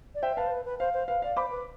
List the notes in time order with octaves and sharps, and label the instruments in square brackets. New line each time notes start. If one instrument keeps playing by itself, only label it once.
[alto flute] D5
[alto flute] C5 [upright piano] E5 G5
[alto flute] B4 [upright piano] F5 A5
[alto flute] C5
B4
B4
[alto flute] C5 [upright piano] F5
[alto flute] C5
[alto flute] B4 [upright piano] F5
[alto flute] D5 [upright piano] F5
[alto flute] C5 [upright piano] B5 D6
[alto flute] B4